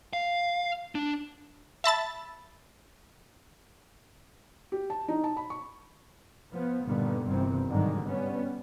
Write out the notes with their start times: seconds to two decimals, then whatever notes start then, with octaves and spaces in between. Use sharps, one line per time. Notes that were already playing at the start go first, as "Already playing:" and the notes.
0.13 F5
0.95 D4
1.84 E5 A5 B5 A6
4.72 G4
4.90 A5
5.08 D#4
5.24 A5
5.37 B5
5.50 C#6
6.53 F3 B3
6.86 G2 A#2 D3 D#3 G3 B3
7.26 G1 G2 C3 D#3 E3 C4
7.70 G#2 D3 D#3 F#3 G3
8.04 G3 B3 C#4